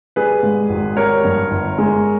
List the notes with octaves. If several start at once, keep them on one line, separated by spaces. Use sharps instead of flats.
G3 G#4 B4
G#2
G#1
G3 A#4 C#5
G2
G1
G#3